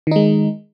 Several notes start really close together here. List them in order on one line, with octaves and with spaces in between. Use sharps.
D#3 D#4 G#3